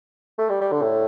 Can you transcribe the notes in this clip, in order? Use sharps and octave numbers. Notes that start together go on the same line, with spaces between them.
A3
G3
G3
D3
A2